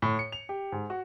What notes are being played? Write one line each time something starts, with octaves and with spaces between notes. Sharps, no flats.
A2
C#7
F7
G4
G#2
F#4